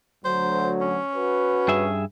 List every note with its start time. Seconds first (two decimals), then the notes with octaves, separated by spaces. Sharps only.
0.25 D2 F#3 C5
0.81 C#4
1.16 F#4 B4
1.68 G2 G#4 E5